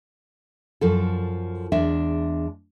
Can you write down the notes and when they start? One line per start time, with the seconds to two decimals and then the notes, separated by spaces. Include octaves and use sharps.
0.81 F#2 F3 A4
1.72 E2 G#3 D4 E5